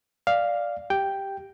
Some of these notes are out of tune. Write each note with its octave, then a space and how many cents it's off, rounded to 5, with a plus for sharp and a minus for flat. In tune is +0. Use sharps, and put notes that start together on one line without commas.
D5 +0 F5 +0
G4 +0 G5 +0